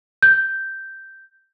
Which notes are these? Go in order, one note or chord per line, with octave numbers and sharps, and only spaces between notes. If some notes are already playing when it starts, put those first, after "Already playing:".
G6